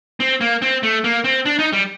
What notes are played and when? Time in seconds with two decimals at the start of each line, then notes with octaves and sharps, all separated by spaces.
0.20 C4
0.41 A#3
0.62 C4
0.83 A3
1.04 A#3
1.24 C4
1.45 D4
1.59 D#4
1.73 G3